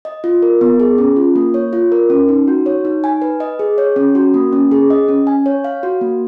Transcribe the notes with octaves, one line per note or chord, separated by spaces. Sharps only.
D#5
F4
A#4
B3
G#4
C#4
F4
A#3
C#5
F4
A#4
C#4
D#4
F#4
C#5
D#4
G#5
B4
D#5
G#4
C#5
C#4
F#4
A#3
C#4
G#4
D#5
C#4
G#5
C#5
F5
F#4
A#3